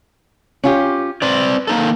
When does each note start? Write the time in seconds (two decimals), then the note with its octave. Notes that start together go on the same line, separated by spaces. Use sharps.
0.64 C#4 F4 G4
1.22 C4 B4 D5
1.67 A#3 D#4 A4